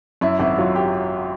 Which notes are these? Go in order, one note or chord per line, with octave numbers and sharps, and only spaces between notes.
F#2 E4
G#1 E4
F#3 F4
G4